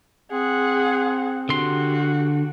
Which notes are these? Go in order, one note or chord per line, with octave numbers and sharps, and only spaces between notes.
C4 G#4 F#5
D3 F#4 G4 C6